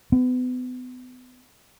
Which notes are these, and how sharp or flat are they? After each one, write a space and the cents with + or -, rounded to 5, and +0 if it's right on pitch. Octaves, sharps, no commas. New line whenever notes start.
B3 +35